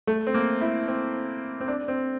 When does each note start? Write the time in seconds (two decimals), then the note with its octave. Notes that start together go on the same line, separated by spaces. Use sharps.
0.07 A3
0.27 C4
0.34 A#3
0.61 E4
0.88 C4
1.60 C4
1.68 D4
1.88 C4